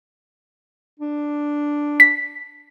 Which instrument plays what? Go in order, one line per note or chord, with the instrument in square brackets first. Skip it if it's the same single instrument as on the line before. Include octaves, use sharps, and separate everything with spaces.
[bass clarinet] D4
[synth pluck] B6